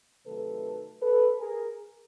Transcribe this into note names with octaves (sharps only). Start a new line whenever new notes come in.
C3 D#3 F#3 A3 A4 B4
A4 B4
G#4 A#4